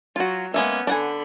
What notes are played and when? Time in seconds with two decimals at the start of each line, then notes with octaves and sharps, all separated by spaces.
0.16 F#3 F4 F#4
0.54 G#3 A#3 B3 C#4 E5
0.87 D3 D4 F#5 G#5 B5